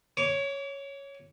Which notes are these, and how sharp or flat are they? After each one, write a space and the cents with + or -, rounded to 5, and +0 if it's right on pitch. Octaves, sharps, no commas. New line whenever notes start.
C#5 +0 D6 -40